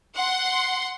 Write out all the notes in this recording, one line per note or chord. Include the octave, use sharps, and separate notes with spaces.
F#5 C6